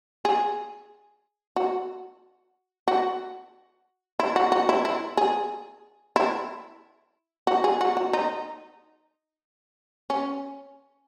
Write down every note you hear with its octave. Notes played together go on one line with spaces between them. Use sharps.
G#4
F#4
F#4
E4
F#4
F#4
E4
E4
G#4
E4
F#4
G#4
F#4
F#4
D#4
C#4